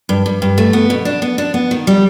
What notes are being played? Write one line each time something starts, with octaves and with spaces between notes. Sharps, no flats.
G2
G2
G2
A3
B3
B2
D4
B3
D4
B3
D#3
G3